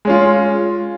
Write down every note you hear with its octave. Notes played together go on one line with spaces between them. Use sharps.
G#3 C#4 F4